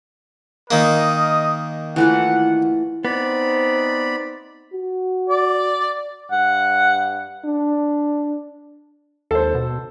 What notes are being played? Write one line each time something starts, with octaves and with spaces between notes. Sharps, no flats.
D#3 A#3 A#4 D#5 D#6
E3 A3 F4 F#5
B3 C4 D#4 C5 D5 B5
F#4
D5
G2 F#5
D4
D#2 A4 C5
B2